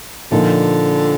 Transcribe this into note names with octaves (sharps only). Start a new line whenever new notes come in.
A#2 D3 F3 A#3 D#4